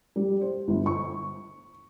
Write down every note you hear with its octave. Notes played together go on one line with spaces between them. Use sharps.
G3
C5
G1
C#6